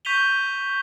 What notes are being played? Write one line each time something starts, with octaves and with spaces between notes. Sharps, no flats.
C#6 G6 B6 D#7 F7 G7